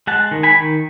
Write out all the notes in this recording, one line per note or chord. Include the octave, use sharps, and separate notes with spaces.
G#3 F#5 A5
D#3
G#5 B5
D#3